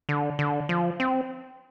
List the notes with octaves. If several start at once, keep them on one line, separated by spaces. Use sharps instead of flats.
D3
D3
F3
C4